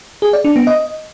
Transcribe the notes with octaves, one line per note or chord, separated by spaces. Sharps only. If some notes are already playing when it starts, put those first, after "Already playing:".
G#4
D5
D4
B3
D#5